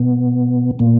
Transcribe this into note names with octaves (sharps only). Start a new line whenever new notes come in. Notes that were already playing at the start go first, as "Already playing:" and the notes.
Already playing: B2 B3
A#2 A#3